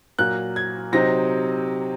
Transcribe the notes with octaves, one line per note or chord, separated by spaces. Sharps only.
A#2 F#3 A#3 F#6
G#6
C3 F#3 C4 D#4 A#6